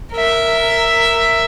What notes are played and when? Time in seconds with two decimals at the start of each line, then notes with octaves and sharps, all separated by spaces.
0.13 A#4 E5